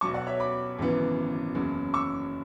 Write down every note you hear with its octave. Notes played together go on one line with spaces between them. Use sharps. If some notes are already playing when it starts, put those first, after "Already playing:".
B1 B2 F#3 A5 C#6
D5 F#5
C#5 E5
B5 D6
G#1 F#2 C#3 E3 B3
F#1 E2 C#3 F#3
C#6 E6